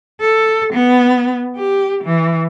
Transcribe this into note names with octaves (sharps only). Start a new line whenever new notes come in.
A4
B3
G4
E3